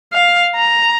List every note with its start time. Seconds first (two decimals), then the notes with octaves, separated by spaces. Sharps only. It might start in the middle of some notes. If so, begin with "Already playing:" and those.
0.13 F5
0.56 A#5